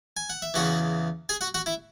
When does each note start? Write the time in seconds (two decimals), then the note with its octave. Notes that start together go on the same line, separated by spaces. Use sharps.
0.17 G#5
0.30 F#5
0.42 E5
0.54 E2 C#3 E3 F#4 F#5
1.29 G#4 G#5
1.41 F#4 F#5
1.54 F#4 F#5
1.66 E4 E5